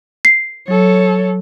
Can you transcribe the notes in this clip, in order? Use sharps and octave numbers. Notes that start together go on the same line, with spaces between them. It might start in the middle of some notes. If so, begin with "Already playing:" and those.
C7
F#3 A4 C#5